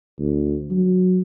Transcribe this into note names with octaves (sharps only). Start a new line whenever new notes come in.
D2
F#3